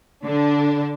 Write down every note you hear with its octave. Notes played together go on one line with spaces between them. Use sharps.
D3 D4